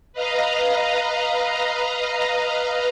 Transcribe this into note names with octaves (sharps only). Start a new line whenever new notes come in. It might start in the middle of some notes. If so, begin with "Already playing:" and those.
B4 D#5 F5 A#5